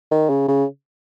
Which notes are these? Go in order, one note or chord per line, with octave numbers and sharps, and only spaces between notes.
D#3
C#3
C#3